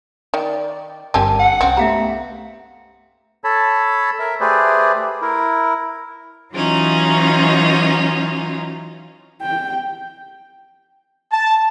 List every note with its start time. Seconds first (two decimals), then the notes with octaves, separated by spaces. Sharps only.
0.34 D#3 D5 G5
1.14 G1 G2 C4 G4 A#4 G#5 A5
1.39 F#5
1.61 C2 C4 C#4
1.77 A3 B3 G4 E5 F5 A#5
3.44 A4 C#5 A5 B5
4.19 A#4 E5
4.41 A3 G4 G#4 B4 C5 D5
5.22 E4 A#4
6.54 E3 F#3 C#4 D#4 F4
9.42 G5
11.32 A5